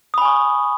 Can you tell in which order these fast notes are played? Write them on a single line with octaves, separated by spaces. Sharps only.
D#6 B5 G#5 C#6